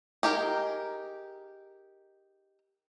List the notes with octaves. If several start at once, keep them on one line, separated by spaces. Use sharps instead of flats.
D#4 G4 G#4 A#4